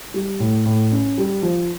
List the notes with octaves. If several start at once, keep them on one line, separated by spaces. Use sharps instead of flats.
G3
A2
A2
C#4
G3
F3